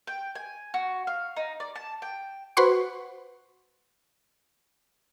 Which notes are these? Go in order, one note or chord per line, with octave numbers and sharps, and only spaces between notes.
G5
G#5
F#4
F5
D#4
D5
A5
G5
F#4 B4 C5 F#5 C6 C#6